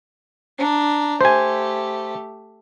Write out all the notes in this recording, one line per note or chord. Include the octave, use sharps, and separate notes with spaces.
D4 A#5
A3 G4 C5 G#5